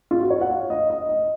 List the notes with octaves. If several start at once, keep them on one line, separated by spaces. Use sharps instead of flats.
F4
F#4
C#5
F#5
F5
D#5
D#5
D#5